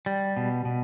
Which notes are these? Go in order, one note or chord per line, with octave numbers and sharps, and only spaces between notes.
G3
B2
B2